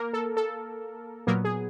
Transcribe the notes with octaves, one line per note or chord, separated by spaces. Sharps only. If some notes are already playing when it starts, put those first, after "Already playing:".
Already playing: A#3 A#4
A4
A4
A#2 F#3 A#3 B3 A#4
G#4